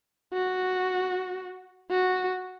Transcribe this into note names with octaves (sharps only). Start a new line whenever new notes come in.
F#4
F#4